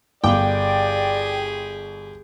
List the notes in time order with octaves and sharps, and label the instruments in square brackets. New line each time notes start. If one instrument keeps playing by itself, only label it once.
[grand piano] G1 D6 [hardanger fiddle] G4 G#4 [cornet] D5 [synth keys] G5